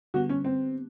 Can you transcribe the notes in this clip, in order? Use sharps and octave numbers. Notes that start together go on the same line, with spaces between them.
D3 G3 B3 F#4
C#4
C4